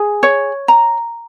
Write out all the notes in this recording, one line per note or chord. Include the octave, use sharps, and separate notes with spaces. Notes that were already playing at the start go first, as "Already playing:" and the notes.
Already playing: G#4
C#5
A#5